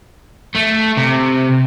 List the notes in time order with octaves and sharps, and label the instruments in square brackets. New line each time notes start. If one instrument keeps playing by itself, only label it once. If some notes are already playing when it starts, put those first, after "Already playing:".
[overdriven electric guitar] A3
C3